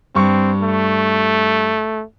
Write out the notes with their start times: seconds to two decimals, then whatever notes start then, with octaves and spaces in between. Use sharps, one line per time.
0.15 G2 C4 C#6
0.61 A3